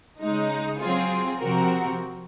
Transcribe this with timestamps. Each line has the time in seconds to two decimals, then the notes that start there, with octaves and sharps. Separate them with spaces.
0.22 C#3 G#3 D#4
0.80 F#3 C4 F4 G#4
1.39 C3 F3 C4 F#4 A#4